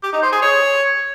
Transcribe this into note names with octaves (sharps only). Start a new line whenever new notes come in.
G4
D#4
C5
G#4
C#5